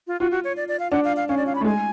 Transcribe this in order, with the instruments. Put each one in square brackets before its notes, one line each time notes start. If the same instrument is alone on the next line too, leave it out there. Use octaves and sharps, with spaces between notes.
[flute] F4
[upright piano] F4 [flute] F#4
[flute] F#4
C#5
D5
D5
F5
[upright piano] D4 [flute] F#5
[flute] F5
F5
[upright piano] C#4 [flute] F5
[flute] D5
F5
B5
[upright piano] A3
[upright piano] G#3 [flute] G#5